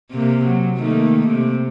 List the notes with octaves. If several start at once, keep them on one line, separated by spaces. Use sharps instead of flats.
C3 A#3
F#3
D#3 A3 A#3
C3